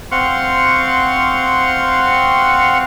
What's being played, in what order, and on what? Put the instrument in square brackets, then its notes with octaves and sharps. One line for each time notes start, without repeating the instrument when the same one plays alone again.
[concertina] C4 F5 F#5 C6 C#6